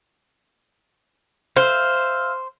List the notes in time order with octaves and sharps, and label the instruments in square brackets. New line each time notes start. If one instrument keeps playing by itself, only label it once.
[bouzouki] C5 [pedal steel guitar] E5 F5